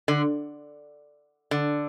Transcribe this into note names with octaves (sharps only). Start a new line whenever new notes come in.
D3
D3